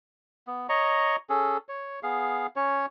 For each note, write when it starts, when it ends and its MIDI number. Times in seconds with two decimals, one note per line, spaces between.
0.47 0.67 59
0.69 1.16 73
0.69 1.16 75
0.69 1.16 82
0.69 1.16 85
1.30 1.57 61
1.30 1.57 68
1.30 1.57 69
1.69 2.00 73
2.03 2.47 59
2.03 2.47 68
2.03 2.47 77
2.56 2.86 61
2.56 2.86 73